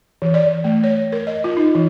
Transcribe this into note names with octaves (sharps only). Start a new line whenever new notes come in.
E3
D5
A3
C#5
A#4
D#5
F4
D#4
E3